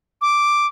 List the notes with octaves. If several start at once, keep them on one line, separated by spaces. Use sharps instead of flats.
D6